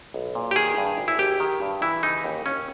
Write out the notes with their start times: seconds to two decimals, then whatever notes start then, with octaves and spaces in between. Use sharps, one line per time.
0.14 B1
0.35 A#2
0.51 G4
0.56 D#3 G#4
0.78 G2
0.98 G#1
1.08 E4
1.19 G#1 G4
1.40 D#3
1.61 G2
1.82 E3 E4
2.03 C#3 D#4
2.24 D#2
2.46 D#2 C#4